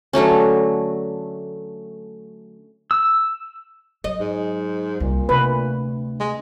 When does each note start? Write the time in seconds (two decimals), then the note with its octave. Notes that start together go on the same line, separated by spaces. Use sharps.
0.13 D3 F#3 A3 C#4
2.91 E6
4.04 F#3 D#5
4.20 G#2
5.00 C2 A#2
5.29 D2 C3 B4
6.20 G#3